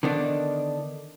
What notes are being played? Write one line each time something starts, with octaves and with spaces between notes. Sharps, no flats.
D3 D#3 B3 D4